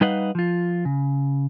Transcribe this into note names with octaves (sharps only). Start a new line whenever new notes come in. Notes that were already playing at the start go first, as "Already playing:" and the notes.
G3 D#4 B4 D#5 F5 F#5
F3 F4
C#3